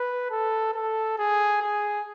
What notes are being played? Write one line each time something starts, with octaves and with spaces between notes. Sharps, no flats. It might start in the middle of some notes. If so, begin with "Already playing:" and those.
Already playing: B4
A4
A4
G#4
G#4